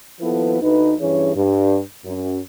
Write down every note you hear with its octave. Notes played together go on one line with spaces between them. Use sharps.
D#2 F3 B3 E4 A4 B4
D2 D#4 B4
G2 E3 C#4 G#4 C#5
G2
F#2